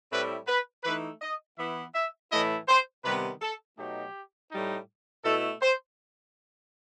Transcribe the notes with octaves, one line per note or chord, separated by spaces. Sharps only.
A2 G3 C4 E4 B4
B4
E3 A3 D#4 B4
D#5
E3 B3 E4 E5
E5
A2 E3 A3 E4 D#5
C5
C3 D#3 G3 B3 B4
A4
B2 F#3 A3 D#4 G4
A2 G3 D#4
B2 A3 E4 A4
C5